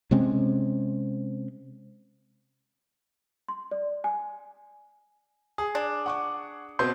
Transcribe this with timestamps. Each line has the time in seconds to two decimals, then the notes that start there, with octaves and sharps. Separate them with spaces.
0.11 C3 G#3 C4 C#4
3.48 C6
3.71 D5
4.04 G#5
5.58 G#4 D#6
5.75 D4
6.06 F#5 C#6 D6
6.79 B2 B3 C4 C6 G6